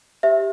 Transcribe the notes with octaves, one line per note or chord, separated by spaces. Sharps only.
G4 C5 E5